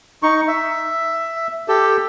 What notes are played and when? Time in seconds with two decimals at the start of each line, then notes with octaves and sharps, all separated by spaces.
0.23 D#4 C#6
0.48 E5
1.68 G4 A4